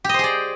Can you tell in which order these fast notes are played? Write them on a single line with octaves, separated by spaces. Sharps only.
G4 D#5 C5 G#4 D5